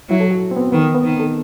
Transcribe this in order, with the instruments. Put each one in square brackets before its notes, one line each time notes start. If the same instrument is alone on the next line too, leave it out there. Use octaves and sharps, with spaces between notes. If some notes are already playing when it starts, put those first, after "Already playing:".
[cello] F#3 [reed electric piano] E4
[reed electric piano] A4
F#4
C4
B3
C4
[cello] D#3 [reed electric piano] B3
[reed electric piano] B3
[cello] D#3 [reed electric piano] C4
[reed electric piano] A4